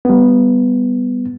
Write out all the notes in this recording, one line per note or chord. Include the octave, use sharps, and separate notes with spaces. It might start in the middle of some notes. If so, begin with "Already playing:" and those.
G3 B3